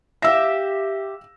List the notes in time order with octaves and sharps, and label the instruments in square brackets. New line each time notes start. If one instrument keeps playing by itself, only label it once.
[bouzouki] G4 E5 [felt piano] F5 E6 A#6